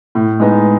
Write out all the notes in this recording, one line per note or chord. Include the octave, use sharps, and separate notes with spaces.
A2
G#3 B3 D#4